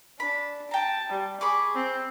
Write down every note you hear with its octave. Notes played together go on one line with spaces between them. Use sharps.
D4 B5
G5 A5 A#5
G3
G#4 B5 C#6 D6
C4